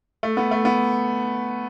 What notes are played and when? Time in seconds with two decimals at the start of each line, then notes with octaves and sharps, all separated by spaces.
0.23 A3
0.37 B3
0.51 A3
0.65 B3